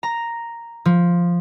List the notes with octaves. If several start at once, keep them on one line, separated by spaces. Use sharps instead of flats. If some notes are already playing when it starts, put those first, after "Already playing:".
A#5
F3